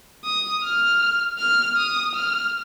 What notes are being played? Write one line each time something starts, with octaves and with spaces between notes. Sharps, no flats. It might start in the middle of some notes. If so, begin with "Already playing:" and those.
D#6
F6
F6
D#6
F6